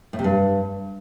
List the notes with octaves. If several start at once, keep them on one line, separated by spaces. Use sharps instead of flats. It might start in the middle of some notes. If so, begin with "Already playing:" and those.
A2
C3
G2